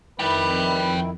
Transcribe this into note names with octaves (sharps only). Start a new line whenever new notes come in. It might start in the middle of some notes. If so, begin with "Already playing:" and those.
F2 D#3 E4 B4 G5 B5